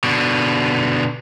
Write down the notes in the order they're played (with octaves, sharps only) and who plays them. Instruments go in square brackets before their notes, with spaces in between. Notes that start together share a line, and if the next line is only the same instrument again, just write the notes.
[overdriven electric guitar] B2 D3